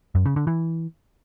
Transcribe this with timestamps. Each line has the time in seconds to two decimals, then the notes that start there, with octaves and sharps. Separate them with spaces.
0.15 F#2
0.26 C#3
0.36 D3
0.47 E3